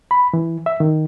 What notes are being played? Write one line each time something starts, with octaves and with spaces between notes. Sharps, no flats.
B5
E3
E5
D#3